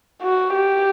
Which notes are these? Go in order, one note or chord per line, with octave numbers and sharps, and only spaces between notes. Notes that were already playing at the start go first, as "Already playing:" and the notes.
F#4
G4